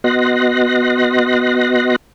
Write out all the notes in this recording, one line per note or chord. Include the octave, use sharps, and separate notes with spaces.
B3 F#4 D#5 C6 F#6 A#6